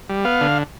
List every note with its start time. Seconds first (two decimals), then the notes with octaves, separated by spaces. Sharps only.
0.09 G3
0.24 B3 F5
0.41 D3